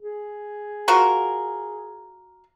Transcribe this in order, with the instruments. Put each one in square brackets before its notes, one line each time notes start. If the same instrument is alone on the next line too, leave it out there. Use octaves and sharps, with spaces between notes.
[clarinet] G#4
[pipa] F4 F#4 A#4